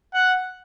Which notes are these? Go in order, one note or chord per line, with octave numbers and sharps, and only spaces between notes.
F#5